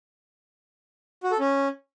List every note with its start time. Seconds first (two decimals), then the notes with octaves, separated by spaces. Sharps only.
1.23 F#4
1.31 A4
1.39 C#4